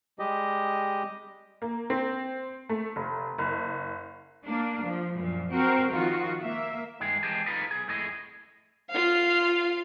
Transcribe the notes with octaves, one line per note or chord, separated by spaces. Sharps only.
G3 G#3 G4 D#5
A#3
C4
A3
F1
F#1
A#3 D4
F3
F#2 A#2 F3
C4 F#4 A#4
D#3 F3 F4 F#4
A#3 E5
G2 D#3 G#3 G#4
E3 G#3 G4 G#4 D#5 A5
D#4 F4 A4 B4 D#5
B1 G#4
F2 A2 A3 G#4 D#5
F4 F5